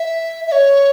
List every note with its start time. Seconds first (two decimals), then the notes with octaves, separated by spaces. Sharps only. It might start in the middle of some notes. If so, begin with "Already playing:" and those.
Already playing: E5
0.47 E5
0.52 C#5